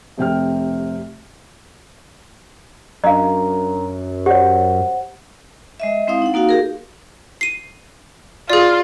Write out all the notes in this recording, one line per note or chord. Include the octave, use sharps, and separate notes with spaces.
F1 C3 G5 F6
F#2 D4 D#5 F5 A#5
G4 C5 C#5 F#5
G#3 D#5 E5
G#3 C4 E4 F5 D#6
D#4 F#5
A#3 D#4 F#4 F5
G4 G#4 A#4
C7 D#7
F4 G#4 D5